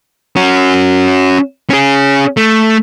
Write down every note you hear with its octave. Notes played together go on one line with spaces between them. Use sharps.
C#4 F#4
C#4 G#4
A3